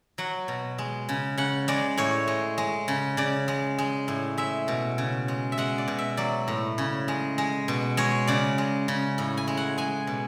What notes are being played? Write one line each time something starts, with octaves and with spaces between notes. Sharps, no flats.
F#3 F#5
B2
G#3
C#3
C#3 F#5
G#3 D5
A2 C#5
G#3
G#3
C#3
C#3 D5
G#3
G#3
A2
G#3 E5
B2
C#3
G#3
E5
G#3 F#5
D5
B2
E5
F#3 D5
A2
C#3
G#3
G#3
B2
G#3 C#5
C#3 D5
G#3
C#3
A2
G#5
G#3
F#5
G#3 G#5
B2